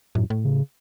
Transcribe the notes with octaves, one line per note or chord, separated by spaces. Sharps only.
F#2 A2
A2
C#3